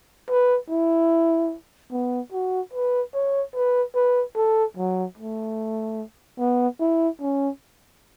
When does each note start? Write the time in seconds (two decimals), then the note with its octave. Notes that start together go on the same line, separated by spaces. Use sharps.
0.29 B4
0.70 E4
1.92 B3
2.32 F#4
2.73 B4
3.14 C#5
3.55 B4
3.95 B4
4.36 A4
4.77 F#3
5.17 A3
6.39 B3
6.80 E4
7.21 C#4